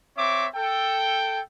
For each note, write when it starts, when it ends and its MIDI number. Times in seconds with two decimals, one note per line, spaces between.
0.17 0.47 60
0.17 0.47 73
0.17 0.47 76
0.17 0.47 86
0.55 1.41 69
0.55 1.41 79